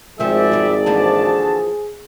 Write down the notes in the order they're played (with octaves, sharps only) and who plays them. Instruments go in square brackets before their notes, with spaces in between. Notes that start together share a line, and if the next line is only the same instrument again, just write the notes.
[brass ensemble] G#1 D5 [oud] D#3 C4 [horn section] F3 G#3 E5 [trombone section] G#4
[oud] E2 G3
[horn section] D3 F#4 A5 [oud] E3 F3 A#3